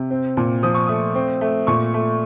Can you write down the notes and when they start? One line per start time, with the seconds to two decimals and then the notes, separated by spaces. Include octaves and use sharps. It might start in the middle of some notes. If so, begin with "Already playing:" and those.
Already playing: C3
0.11 C4
0.37 A#2
0.63 F3 D#6
0.74 C#6
0.87 A3 D#6
1.15 C4
1.41 A3
1.67 A#2 C#6
1.94 A3